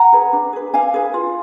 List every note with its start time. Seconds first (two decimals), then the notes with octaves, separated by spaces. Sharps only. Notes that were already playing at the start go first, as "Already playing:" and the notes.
Already playing: F#5 A#5
0.13 G#4 B4
0.33 D4
0.53 G#4 B4
0.74 D4 F5 G#5
0.94 G#4 B4
1.14 F4